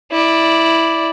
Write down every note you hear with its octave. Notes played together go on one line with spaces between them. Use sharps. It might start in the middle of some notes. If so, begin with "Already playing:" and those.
E4 D5